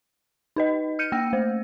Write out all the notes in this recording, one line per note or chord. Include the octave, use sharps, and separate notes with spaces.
D#4 B4 D#5
F6 G6 C#7 D#7
A#3 G5 E6 A#6
A3 C5